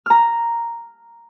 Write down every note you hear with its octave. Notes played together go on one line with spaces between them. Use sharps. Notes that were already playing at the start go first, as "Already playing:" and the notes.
A#5 F6